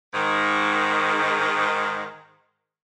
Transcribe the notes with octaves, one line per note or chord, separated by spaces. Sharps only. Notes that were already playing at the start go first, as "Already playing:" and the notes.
G#2 D#3